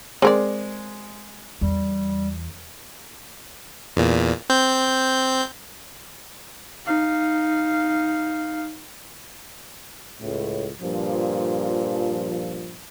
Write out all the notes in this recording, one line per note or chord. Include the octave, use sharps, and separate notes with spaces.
G#3 C4 A#4 D5
E2 G3
E2 A#2
C4 G6
D#4 F5
C#2 A2
G2 A#2 F3